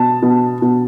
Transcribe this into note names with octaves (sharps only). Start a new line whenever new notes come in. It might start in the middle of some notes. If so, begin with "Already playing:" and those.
Already playing: B2 A5
B2
B2